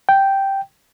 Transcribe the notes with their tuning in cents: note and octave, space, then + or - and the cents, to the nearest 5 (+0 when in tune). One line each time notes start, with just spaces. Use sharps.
G5 -5